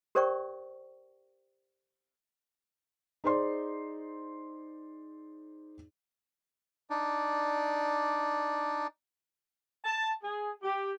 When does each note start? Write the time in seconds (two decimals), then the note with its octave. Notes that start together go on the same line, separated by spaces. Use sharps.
0.15 G4 A#4 C5 D5 G5 C#6
3.24 D#4 G#4 C5 D5 C6
6.90 D4 D#4 D5
9.85 A5
10.23 G#4
10.63 G4